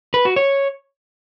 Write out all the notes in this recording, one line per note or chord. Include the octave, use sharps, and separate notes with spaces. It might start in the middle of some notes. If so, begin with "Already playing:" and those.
B4
F#4
C#5